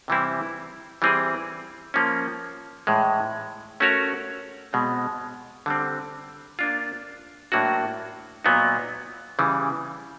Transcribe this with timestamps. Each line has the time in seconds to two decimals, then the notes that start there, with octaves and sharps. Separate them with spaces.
0.08 C3 E3 G3 C4 E4
1.02 E3 G3 C4 E4 G#4
1.94 F3 A#3 C#4
2.87 A2 E3 G#3
3.80 A3 C#4 F#4 A#4 C#5
4.73 B2 G#3 C4
5.66 D3 G3 C4
6.59 A#3 D4 F4
7.52 A2 F#3 A#3 D4 F#4
8.44 A#2 F#3 B3 D#4
9.39 C#3 E3 G3